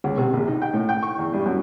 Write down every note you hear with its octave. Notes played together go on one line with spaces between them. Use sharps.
C#2
C3
A#1
D#4
G5
A2
G5
C#6
E2
G2
F#2